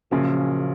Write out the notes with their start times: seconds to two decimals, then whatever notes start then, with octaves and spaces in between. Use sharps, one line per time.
0.11 A#1 A#2 C#3 F3 F#3 A#3 C#4